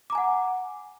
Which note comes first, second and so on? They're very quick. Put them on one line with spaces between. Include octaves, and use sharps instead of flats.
D6 A#5 G#5 F#5